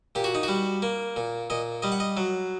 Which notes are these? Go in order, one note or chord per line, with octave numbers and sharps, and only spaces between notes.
A#2 G4
F#4
D#4
G3 F#4
A#3
A#2
A#2 D#5
G3 D#5
F#5
D#5
F#3